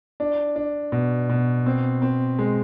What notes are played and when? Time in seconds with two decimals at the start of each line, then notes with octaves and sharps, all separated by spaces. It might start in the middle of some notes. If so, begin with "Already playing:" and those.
0.20 D4
0.56 D4
0.92 B2
1.29 B2
1.66 C4
2.02 C4
2.39 G#3